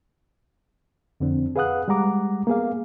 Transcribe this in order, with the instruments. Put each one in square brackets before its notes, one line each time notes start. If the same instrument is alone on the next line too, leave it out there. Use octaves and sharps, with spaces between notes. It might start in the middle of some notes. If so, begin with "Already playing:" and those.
[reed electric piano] F2 D3 C4 D4
G#4 B4 F5 F#5 D#6 F#6
G3 G#3 F#5 A#5 D6
A#3 B3 G#4 F5